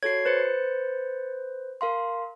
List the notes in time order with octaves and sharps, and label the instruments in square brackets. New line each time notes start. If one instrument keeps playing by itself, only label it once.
[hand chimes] F#4 A4 C#5 [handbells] G#6 C7
[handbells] B4 C5 [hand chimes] A6 C#7
[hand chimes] A#4 F5 C6